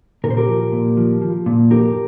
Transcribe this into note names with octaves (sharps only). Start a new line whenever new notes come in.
A#2 A#4
C5
G4 A#4
F3
A#2
F3
F3
A#2
F2 G4 A#4